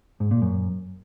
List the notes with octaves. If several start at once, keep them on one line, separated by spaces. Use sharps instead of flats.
G#2
A#2
F#2